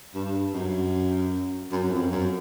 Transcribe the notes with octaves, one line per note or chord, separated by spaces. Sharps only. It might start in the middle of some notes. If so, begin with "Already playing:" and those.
G2
F#2
F#2
F#2
F2
F#2